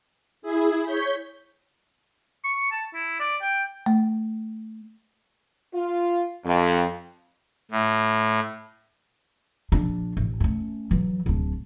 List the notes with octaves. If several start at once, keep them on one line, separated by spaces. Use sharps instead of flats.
E4 G#4
C#5 G6 B6
C#6
A5
E4
D5
G5
A3
F4
F2
A2
A#1 D4
A1
A3 C#4
E3 F#3
D1 D4